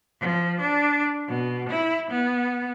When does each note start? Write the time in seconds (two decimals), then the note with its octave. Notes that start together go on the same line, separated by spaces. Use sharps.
0.20 F3
0.59 D4
1.27 B2
1.70 E4
2.10 B3